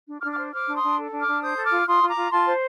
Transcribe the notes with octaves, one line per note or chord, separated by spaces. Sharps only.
D4
D6 F6
D4
D6 F6
C5
C5 D6 F6
D4
C6 D#6
D4
A4
D4
D6 F6
D4
C5 D#6 G6
A4
D6 F6
F4
F4 C6 D#6
F4
A#5 D6
F4
F4 A5 C6
C5